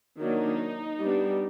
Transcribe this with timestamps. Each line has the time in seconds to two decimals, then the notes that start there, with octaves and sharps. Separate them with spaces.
0.19 D#3 F#3 A#3 D4 D#4
1.01 G3 B3 D4